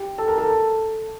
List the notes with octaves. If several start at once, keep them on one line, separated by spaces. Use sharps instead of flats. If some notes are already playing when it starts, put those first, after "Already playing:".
Already playing: G4 G5
A4 A5
A#4 A#5
A4 A5